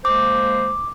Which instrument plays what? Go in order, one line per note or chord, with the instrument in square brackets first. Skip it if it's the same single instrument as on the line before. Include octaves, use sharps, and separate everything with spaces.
[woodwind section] G#3 A#3 C5 [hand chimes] D6